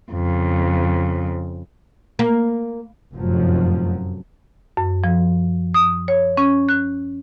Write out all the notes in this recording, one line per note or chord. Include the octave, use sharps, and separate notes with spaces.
F2 C#3
A#3
F1 F#2 A2 F3 F#3
F#2
F3
D#6
C#5
C#4
F#6